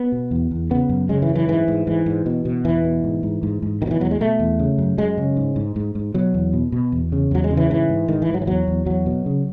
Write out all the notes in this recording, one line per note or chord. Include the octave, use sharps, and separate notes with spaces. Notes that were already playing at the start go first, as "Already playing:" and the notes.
Already playing: B3
B2
E2
E2
C#3 B3
F#2
C#3 G#3
E3
F#2
E3
G#2 E3
G#2
G#2 E3
G#2
B2
B2
E2 E3
B2
G#2
G#2
G#2
G#2
B2 D#3
F#3
E3
E2 F#3
G#3
B2 A3
E2
C#3
F#2
F#2 G#3
C#3
G#2
G#2
G#2
G#2
B2 F#3
E2
B2
B2
E2
C#3
E2 F#3
G#3
C#3
E3
G#2 E3
G#2
G#2 D#3
E3
G#2
F#3
E3
E2 F#3
E2
E2 F#3
B2
C#3